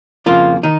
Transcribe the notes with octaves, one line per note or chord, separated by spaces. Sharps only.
F2 C#3 F3 A#3 F4
D#3 D#4